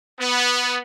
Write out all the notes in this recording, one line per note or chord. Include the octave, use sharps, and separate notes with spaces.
B3